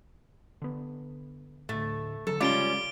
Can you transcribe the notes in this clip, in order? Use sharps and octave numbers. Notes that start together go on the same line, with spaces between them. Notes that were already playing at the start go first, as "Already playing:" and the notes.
D3 B3
D2 A2 A3
D3 D#3 F#3 A4
C#3 G3 G#3 C#4 F4 D6 D7 G7